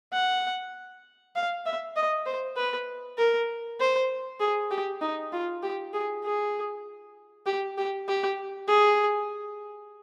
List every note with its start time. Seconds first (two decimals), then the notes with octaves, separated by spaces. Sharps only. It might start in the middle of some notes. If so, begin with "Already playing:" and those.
0.13 F#5
1.36 F5
1.66 E5
1.96 D#5
2.26 C5
2.57 B4
3.18 A#4
3.80 C5
4.41 G#4
4.71 G4
5.02 D#4
5.33 F4
5.63 G4
5.93 G#4
6.24 G#4
7.46 G4
7.78 G4
8.08 G4
8.68 G#4